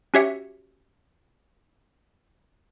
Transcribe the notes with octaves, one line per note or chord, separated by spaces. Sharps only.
C#4 F#4 G4 C#5 E5 C#7